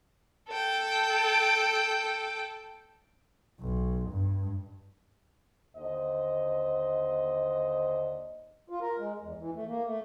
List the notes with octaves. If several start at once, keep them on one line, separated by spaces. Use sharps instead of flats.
A4 G5
B1
G2
D#2 D3 C5 D#5
F4
A#4
G#3
E2
E3
A3
A#3
A3